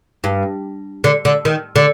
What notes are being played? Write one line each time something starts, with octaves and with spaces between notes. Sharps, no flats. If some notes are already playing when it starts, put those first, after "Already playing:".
G2
D3
D3
D#3
D3